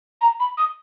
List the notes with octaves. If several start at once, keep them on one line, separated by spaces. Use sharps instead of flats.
A#5
B5
D#6